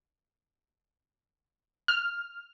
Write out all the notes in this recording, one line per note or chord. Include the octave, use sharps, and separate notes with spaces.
F6